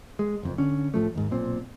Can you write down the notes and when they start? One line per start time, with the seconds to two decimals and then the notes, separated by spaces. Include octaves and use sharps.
0.19 G#3
0.43 F#1 F2
0.58 D3 C#4
0.94 A2 F3 A3
1.15 D#2 G#2
1.31 B1 A#2 C4